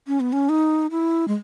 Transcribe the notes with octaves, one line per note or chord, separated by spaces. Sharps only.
C#4
B3
C#4
D#4
E4
G#3